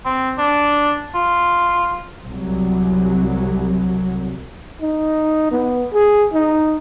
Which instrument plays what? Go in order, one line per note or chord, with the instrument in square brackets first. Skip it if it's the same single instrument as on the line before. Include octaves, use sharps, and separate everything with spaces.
[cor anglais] C4
D4
F4
[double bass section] C2 F#3
[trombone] D#4
B3
G#4
D#4